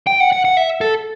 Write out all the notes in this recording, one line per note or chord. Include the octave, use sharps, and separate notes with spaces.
G5
F#5
F#5
F#5
E5
A4